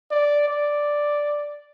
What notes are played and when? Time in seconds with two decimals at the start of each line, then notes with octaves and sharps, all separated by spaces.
0.11 D5
0.48 D5